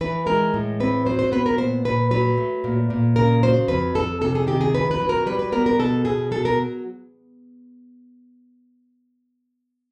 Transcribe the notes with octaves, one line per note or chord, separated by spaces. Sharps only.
E3 B4
G#3 A#4
A2
C4 B4
F#3 C5
C5
B3 B4
A#4
A#2 C5
A#2 B4
F#3 B4
A3
A#2
A#2
C#3 A#4
F#3 C5
F2 B4
F2 A4
C3 A4
G#4
D#3 G4
G#4
F2 B4
B4
F#3
A#4
G3 B4
B4
B3 A#4
A#4
B2 A4
B2 G#4
F#3 A4
A#4